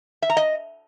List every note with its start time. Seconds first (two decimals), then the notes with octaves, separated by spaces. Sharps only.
0.22 E5
0.30 A#5
0.37 D#5